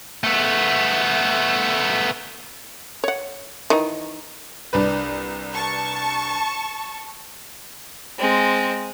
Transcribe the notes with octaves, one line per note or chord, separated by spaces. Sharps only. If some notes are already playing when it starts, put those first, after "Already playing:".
A3 B3
C#5 F#5
D#3 E3 D#4
C2 D4 B4
A5 C#6
G#3 C4